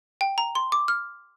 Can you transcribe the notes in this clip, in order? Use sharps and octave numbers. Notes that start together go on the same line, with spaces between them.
G5
A#5
C6
D6
F6